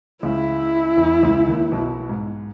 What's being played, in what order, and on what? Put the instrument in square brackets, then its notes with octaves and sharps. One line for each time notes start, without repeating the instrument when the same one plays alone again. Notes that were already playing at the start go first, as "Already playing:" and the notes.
[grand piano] C#2 C#3 [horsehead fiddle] E4
[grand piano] E2 E3
C#2 C#3
D#2 D#3
B1 B2
G#2